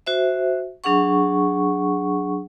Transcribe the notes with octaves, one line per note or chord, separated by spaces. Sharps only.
F#4 C5 E5
F#3 D4 G#4 F#5 C#6